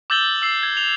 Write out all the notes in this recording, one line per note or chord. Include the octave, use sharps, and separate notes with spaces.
D6 E6 G6 A6 F#7 G7
E6 C7
G#6
F7 G7